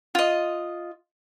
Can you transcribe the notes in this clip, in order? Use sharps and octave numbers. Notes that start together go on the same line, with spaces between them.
F4 D#5